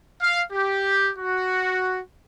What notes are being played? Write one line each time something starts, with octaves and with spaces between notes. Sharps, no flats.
F5
G4
F#4